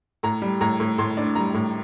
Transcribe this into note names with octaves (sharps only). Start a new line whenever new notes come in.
A2 A#5
G3
A2 A#5
A2
A2 C6
D4
G3 A#5
A2